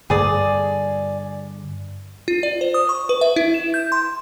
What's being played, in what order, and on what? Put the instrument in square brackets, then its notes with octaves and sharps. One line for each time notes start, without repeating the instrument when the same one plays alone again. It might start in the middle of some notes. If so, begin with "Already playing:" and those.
[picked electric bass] G2 D3 [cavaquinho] G#4 D5
[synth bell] F4
D5
C5
D#6
C#6
B4
E5
E4
E7
G6
C6